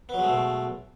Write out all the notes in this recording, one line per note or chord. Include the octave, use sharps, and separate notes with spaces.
B2 F#3 G#3 A3 B3